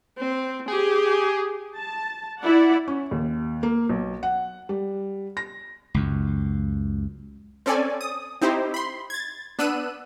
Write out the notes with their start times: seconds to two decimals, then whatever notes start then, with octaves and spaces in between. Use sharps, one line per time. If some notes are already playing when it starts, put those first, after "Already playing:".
0.17 C4
0.68 G4 G#4
1.76 A5
2.40 E4 D5 F#5
2.88 C#4
3.11 D#2
3.63 A#3
3.89 B1
4.23 F#5
4.69 G3
5.37 A#6
5.94 C#2 F#2
7.66 C4 C#4 A4 D5 G#5
8.01 D#6
8.41 C4 D#4 E4 G4 C5
8.74 B5 C6
9.10 G#6 A6
9.59 B3 D4 E6 F#6 D#7